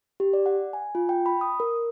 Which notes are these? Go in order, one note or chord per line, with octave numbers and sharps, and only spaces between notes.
G4
D5
F#5
G#5
F4
G5
B5
D#6
A#4